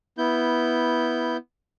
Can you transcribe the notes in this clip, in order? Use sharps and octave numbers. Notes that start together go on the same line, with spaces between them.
B3 E4 G6